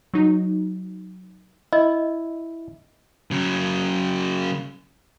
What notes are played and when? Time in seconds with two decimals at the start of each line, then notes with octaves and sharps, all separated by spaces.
0.14 F#3 D#4
1.73 E4 D#5
3.31 C#3 F#3